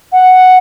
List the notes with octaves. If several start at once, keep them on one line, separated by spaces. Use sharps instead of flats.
F#5